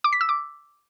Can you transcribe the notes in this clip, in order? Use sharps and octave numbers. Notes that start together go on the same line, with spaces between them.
D6
B6
E6
D6